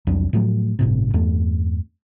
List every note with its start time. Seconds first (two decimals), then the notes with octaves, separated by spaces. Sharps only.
0.07 C2 F2 F#3 D4
0.33 A2 F3 F#3 A3
0.79 G1 A2 C3
1.14 E2 G2 A3